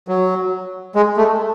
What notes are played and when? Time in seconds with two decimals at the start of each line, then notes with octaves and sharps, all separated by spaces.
0.08 F#3
0.95 G#3
1.17 A3